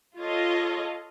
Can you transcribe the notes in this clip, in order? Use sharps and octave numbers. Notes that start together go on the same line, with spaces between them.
F4 A4 C#5 D#5